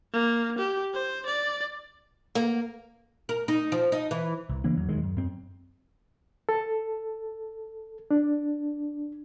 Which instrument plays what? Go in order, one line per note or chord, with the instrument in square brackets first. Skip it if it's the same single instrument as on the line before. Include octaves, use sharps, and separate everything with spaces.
[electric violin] A#3
G4
C5
D5
[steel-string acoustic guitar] A#3
[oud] A#4
D#4
F3
D#4
E3
[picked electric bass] C2
C#3 E3 A#3 D4
E2 F#3
E1 D#2 D#3 G#3
F#2
F#2 C4
[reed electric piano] A4
D4